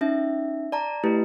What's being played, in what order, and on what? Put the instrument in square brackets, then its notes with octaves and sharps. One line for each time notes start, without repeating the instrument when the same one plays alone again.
[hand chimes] C#4 D#4 E5
D5 A5 A#5
A3 E4 G4 B4